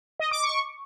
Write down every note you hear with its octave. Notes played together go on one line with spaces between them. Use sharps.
D#5
D6
C#6